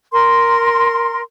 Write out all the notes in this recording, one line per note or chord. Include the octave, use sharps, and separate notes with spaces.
A#4 C6